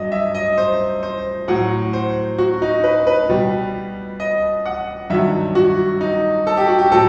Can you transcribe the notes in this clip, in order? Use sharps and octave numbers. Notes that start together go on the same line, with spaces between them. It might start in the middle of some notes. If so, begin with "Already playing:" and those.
Already playing: G2 F#3 D#5
E5
D#5
C5
C5
A2 F#3 F#5
C5
F#4
D#4
B4
B4
B2 G3
D#5
F#5
G2 D#3 F#3 E5
F#4
D#4
A4
G4
F#4
G4
A2 F#3 A4